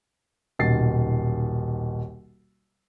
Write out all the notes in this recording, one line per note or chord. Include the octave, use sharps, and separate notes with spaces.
D#1 B1 A6 C7